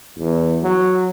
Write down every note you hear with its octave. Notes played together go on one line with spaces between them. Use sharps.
E2
F#3